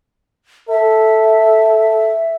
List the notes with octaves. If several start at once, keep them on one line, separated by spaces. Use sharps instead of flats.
A4 E5